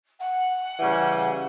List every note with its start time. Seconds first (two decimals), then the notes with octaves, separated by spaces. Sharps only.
0.19 F#5
0.80 C#3 E3 G3